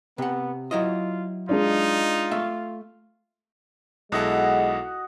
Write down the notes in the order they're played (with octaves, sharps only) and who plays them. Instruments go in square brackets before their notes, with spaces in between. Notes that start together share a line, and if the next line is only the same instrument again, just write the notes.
[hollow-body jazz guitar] C3 F#5 [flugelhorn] B3
[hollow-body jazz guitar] F#3 E4 D#5 [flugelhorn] F4
[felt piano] G#3 D4 D5 [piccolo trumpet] D#4 [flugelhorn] F4
[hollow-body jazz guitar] A3 E5 F5
[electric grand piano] B1 E4 A4 [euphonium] G#3 [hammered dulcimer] F#4 D#5 F#5